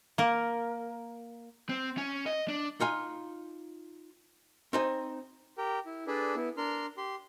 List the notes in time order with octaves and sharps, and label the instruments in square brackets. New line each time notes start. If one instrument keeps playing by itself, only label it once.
[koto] A#3 A#4
[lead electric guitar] C4
C#4
D#5
D4
[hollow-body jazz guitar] D#4 F4 G#5
C4 D#4 G#5
[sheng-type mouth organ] G4 A#4 G5
E4
D4 G#4 A4 B4 D5
B3 E4
D4 A#4 C6 F6
G4 C6